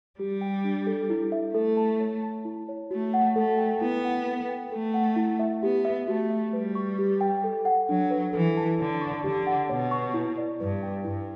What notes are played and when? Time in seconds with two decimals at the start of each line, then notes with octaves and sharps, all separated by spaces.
0.19 G3 G4
0.41 G5
0.64 D4
0.87 A4
1.10 E4
1.32 E5
1.54 A3 A4
1.77 A5
2.00 C#5
2.23 A5
2.45 E4
2.69 C#5
2.91 A3 F#4
3.14 F#5
3.36 A3 A4
3.58 G5
3.81 B3 E4
4.04 F#5
4.26 A4
4.49 G5
4.72 A3 A4
4.94 F#5
5.16 E4
5.39 E5
5.62 B3 G4
5.85 E5
6.08 A3 F#4
6.30 E5
6.53 G3 B4
6.75 C#6
6.99 G4
7.21 G5
7.44 A4
7.65 F#5
7.89 F#3 D4
8.11 B4
8.33 E3 A4
8.57 A5
8.79 D3 C#5
9.01 C#6
9.24 D3 G4
9.47 F#5
9.70 B2 C#5
9.91 C#6
10.14 E4
10.38 D5
10.60 G2 B4
10.83 G5
11.05 G2 E4